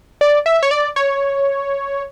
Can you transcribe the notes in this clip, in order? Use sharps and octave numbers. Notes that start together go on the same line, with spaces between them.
D5
E5
C#5
D5
C#5